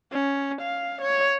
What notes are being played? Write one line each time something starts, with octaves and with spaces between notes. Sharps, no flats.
C#4
F5
C#5